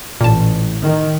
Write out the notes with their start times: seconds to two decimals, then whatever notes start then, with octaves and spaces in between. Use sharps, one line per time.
0.21 A1 A#2 A5
0.83 D#3